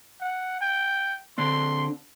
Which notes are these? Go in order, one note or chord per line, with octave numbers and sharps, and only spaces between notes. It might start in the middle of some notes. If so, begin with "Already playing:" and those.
F#5
G5
D3 C4 D4 C6